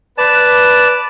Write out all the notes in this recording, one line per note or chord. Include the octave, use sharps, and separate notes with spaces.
B4 D5 A5